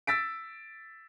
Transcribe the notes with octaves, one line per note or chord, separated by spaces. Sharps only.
E6 A6 B6 D7